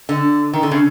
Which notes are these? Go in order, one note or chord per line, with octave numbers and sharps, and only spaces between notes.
D3
D#3
D3
C#3